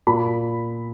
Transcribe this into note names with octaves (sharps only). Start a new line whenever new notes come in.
A#2 B5